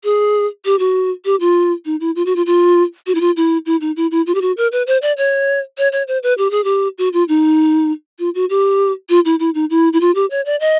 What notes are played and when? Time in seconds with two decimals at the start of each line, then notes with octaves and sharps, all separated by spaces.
0.04 G#4
0.65 G4
0.79 F#4
1.25 G4
1.40 F4
1.85 D#4
2.00 E4
2.16 F4
2.26 F#4
2.36 F4
2.46 F4
3.07 F#4
3.15 E4
3.21 F4
3.37 E4
3.66 E4
3.81 D#4
3.96 E4
4.11 E4
4.27 F4
4.35 G4
4.41 F#4
4.57 A#4
4.72 B4
4.87 C5
5.02 D5
5.18 C#5
5.78 C#5
5.92 C#5
6.08 C5
6.23 B4
6.38 G4
6.51 G#4
6.64 G4
6.98 F#4
7.13 F4
7.28 D#4
8.19 F4
8.35 F#4
8.50 G4
9.09 F4
9.25 E4
9.39 E4
9.55 D#4
9.70 E4
9.93 E4
10.01 F4
10.15 G4
10.31 C#5
10.46 D5
10.60 D#5